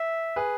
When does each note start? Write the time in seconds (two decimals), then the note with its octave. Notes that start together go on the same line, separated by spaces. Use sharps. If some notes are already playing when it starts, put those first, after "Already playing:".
Already playing: E5
0.36 G#4 B4